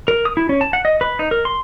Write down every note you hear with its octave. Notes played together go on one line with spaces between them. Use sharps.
A#4
D#6
E4
C#4
A5
F#5
D#5
B4
D#4
A#4
C6